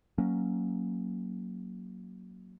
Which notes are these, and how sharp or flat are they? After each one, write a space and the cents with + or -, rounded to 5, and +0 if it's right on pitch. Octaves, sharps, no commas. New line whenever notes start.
F#3 +0 A#3 +0 C#4 +0